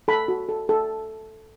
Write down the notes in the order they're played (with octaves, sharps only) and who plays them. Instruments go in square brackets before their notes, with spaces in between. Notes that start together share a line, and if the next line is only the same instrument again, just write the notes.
[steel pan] A4 B5
F#4
A4
A4